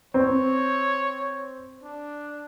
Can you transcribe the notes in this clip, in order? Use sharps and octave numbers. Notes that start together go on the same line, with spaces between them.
C4 C#5
D4